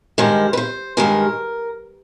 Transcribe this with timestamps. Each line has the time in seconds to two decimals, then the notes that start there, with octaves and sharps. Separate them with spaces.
0.18 G2 D#3 G#3 C5
0.53 B4
0.57 C5
0.97 G2 D#3 G#3 A#4